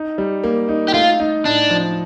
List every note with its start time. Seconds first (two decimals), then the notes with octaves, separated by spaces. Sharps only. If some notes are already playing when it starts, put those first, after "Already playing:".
Already playing: D#4
0.18 G3
0.44 A#3
0.69 D#4
0.88 G4
0.94 A3 F4
1.20 D#4
1.45 A2 D4
1.70 F3